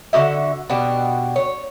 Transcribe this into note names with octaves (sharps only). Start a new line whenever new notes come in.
D3 F#4 G4 E5
B2 D4 F#4 G4
C#5